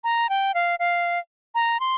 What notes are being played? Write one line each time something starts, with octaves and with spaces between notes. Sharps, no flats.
A#5
G5
F5
F5
A#5
C6